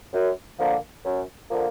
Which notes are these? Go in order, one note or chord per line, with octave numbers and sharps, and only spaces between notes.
F#2
D3 F3 A#3
F#2
D3 F3 A#3